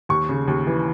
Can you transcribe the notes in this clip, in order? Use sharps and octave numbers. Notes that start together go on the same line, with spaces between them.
D#2 C#6
C#3
D#2
E3